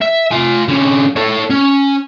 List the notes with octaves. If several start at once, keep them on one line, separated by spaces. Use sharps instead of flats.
E5
F4 G#5
D3 C#4
A4 C#5
C#4